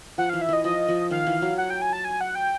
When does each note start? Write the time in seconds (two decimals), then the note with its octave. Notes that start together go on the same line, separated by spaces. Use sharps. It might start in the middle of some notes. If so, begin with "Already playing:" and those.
0.18 F3 F#5
0.30 E3 F5
0.41 E5
0.49 E3 D#5
0.64 F3 D#5
0.88 F3
1.11 D#3 F5
1.27 E3
1.42 F#3
1.58 F#5
1.70 G5
1.82 G#5
1.93 A5
2.05 G#5
2.21 F#5
2.35 G5